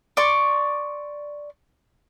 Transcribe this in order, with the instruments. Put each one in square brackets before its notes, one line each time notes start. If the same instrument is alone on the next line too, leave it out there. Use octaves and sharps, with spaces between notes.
[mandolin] D5 C6 C#6